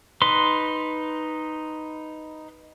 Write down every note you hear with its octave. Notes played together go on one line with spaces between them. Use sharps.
D#4 B4 C6